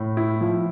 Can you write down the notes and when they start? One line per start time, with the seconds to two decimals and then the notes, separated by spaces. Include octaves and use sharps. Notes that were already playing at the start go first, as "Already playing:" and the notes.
Already playing: A2
0.17 E4
0.41 F3